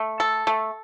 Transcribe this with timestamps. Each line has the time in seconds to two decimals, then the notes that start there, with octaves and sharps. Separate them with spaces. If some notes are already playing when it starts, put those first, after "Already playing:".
Already playing: A3
0.20 A4
0.47 A3